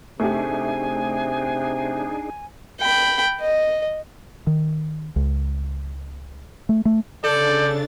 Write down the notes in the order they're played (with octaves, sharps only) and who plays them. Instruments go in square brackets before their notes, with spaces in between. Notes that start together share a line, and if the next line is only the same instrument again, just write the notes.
[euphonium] C3 [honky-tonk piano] A3 G4 [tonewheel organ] D4 D#4 G#4 [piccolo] G#5
[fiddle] G5 B5
D#5
[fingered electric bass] D#3
C#2
A3
A3
[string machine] C#3 D4 A6 [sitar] A4 [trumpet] D5 [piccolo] G6